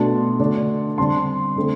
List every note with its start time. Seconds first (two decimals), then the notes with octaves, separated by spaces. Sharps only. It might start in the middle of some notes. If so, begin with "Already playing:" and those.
Already playing: B2 A3 D4 A5 C6
0.39 D3 A3 D4
0.98 D3 G3 C4 A5 C6
1.56 D3 A3 C4